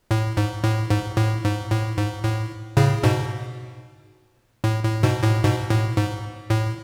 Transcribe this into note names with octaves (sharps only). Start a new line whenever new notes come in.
A2
G#2
A2
G#2
A2
G#2
A2
G#2
A2
A2 C#3
G#2 B2
A2
A2
G#2 B2
A2
G#2 B2
A2
G#2
A2